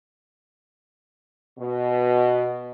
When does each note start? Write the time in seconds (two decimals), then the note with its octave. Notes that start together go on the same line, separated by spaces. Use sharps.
1.59 B2